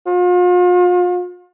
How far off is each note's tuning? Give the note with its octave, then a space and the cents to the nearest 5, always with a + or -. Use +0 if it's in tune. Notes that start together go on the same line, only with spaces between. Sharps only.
F4 +40